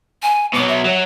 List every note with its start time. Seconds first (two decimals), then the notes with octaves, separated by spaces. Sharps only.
0.22 G#5
0.54 B2 F#3 D6
0.68 E5
0.85 F#3